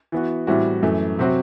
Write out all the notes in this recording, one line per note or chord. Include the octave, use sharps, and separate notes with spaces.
E3 B3 F#4
A2 E3 G3 C4 F#4
F#2 E3 A3
C3 F#3 C4 F#4